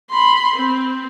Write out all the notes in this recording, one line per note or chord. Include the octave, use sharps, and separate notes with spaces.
B5 C6
C4